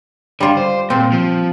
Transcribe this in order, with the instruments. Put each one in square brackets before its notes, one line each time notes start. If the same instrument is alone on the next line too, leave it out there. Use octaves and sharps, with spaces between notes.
[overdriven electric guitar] D3 [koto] G3 F4
[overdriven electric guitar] C5
[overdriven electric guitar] A#2 [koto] C4
[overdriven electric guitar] F3